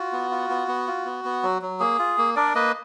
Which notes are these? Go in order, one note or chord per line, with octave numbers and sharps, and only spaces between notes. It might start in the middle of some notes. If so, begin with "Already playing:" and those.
Already playing: F4 F#4
B3
F4
B3
B3
F4
B3
B3
F#3
F#3
A#3 G#4
F4
A#3
D4 A#4 D5
A#3 B4 D#5